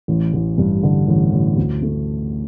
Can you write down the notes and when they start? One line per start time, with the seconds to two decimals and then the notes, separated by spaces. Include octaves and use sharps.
0.08 A1
0.33 A1
0.58 G2
0.83 D3
1.08 A1
1.32 A1
1.57 D2
1.82 A3